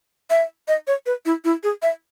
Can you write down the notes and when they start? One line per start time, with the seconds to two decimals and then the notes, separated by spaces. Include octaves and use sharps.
0.30 E5
0.68 D#5
0.87 C#5
1.06 B4
1.26 E4
1.45 E4
1.63 G#4
1.82 E5